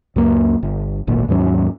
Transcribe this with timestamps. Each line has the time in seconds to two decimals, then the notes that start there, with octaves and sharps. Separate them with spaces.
0.16 C#2 F#2 A#3
0.63 G1
1.07 D1 G#1 A#2
1.28 D#2 G#2 F#3 C#4